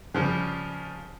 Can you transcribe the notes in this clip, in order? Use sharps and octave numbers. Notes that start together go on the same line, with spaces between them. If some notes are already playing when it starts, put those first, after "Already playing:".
C#3 F3 G3